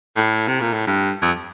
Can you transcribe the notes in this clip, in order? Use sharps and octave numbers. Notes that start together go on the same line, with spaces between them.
A2
C3
A#2
A2
G2
F2